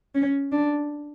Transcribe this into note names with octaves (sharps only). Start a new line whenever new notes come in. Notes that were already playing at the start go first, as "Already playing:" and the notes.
C#4
D4